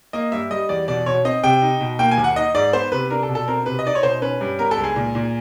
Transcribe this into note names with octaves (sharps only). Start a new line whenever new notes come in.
A#3 D#5
G2 E5
G3 D#5
E2 D5
B2 D5
B2 C#5
C4 D#5
C3 G5
D#4
B2
A#3 G5
G#5
D#2
F#5
D#4 D#5
G#2 D5
B3 C5
C3 B4
D4 A#4
A4
B2
A4
C4 A#4
C3 B4
D#5
D#4 D5
C#5
B2 C5
C#4 B4
G2
B3 A#4
A4
C#2
G#4
A#2
A#2